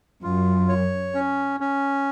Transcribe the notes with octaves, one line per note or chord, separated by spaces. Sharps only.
F#2 F4
C#5
C#4
C#4